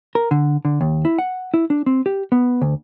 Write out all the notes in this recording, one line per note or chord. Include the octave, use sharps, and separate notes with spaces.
A#4
D3
D3
D#2
E4
F#5
E4
D4
C4
G4
B3
D2